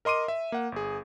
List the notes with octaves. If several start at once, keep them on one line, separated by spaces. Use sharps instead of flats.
A#4 D#5 C6 D6 D#7
E5
A#3 F#5
G1 G#4